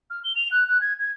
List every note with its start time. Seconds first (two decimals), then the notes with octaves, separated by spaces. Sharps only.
0.10 F6
0.24 G7
0.36 F7
0.51 F#6
0.68 F#6
0.81 G#6
1.00 G#6